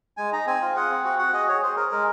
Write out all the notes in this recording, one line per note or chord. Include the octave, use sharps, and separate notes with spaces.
G#3 G#5
D#4 A#5
C4 G#5
F4
G#4 F#5
C4
F#4 F#5
F#4 F#5
G#4 D#5
G#4 C#5
G#4 C5
G#4 A#4
G#3 A#4